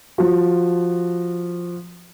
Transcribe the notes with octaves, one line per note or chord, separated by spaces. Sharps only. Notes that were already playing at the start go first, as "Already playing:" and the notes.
F3 F#4